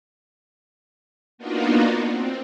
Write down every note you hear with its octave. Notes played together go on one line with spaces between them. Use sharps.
A#3 B3 D4 D#4 F4 F#4
C4